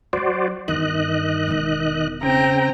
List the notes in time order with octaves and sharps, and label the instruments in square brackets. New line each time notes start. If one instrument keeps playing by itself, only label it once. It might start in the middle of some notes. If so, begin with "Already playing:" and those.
[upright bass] E3 F#3 [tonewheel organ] F#4 C5 D5
[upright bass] E2 G2 [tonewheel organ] D#3 D#5 F#6
[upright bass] E1 E2
[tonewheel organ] C#3 G5 [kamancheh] C4 A#5